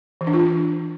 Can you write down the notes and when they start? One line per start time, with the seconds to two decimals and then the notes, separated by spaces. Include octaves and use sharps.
0.21 E3
0.27 D4
0.33 F4
0.40 D4